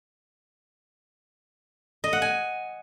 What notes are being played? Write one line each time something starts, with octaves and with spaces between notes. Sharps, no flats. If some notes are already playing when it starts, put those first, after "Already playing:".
D#5
F#5
G#5